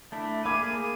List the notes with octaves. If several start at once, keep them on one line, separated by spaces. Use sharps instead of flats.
A3 D4 E4
A#3 G#4 B5 D6 G#6 D#7